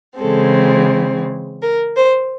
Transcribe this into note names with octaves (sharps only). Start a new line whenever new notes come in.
C#3 E3 G#3 C4 A4
A#4
C5